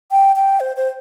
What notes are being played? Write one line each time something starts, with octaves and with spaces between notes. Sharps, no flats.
G5
G5
C5
C5